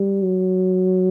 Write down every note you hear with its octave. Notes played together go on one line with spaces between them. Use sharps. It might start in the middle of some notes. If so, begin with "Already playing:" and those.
Already playing: G3
F#3